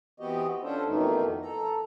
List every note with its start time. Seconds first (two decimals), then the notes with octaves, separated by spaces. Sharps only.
0.20 E3 B3 C4 F#4 G4 D#5
0.63 C#4 D4 F4 A4 C5
0.86 F2 B2 D#3 E3 A3 D#4
1.42 A4 A#5